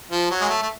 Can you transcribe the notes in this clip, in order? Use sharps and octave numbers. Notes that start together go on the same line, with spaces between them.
F3
F#3
G#3
A3
A3